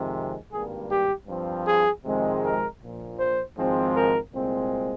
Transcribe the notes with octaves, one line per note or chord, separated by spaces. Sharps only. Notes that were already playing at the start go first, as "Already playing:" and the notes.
Already playing: F2 C3 D#3 G#3
G#1 G2 G3 A#3 G#4
G4
G2 F3 C4
G#4
F2 C3 D#3 G#3 C4
A#4
A#1 A#2 F3
C5
G#1 G#2 F3 G#3 C4
A#4
C2 A#2 G#3 C4